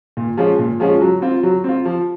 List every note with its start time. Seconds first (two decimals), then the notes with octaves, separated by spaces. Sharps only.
0.17 A#2
0.37 F3 G#3 C#4 F4
0.59 A#2
0.80 F3 G#3 C#4 F4
1.01 F#3
1.22 C4 F4
1.43 F#3
1.64 C4 F4
1.85 F3